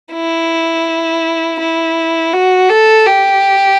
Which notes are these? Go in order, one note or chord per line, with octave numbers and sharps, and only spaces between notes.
E4
E4
F#4
A4
G4